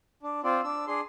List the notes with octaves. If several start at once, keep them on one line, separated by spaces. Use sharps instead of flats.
D4
C4 F4 D5
D4 E6
D4 G#4 C6